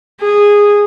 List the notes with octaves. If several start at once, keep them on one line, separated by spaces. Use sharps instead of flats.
G#4